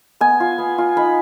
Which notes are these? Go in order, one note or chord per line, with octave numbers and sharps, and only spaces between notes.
B3 G#5
F4
B3
F4
D#4 B5